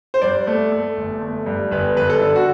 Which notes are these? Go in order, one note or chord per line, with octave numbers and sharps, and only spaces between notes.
C5
G2 D5
A3
A3
G1
A3
G2
G1 B4
G2 B4
A4
D3
F#4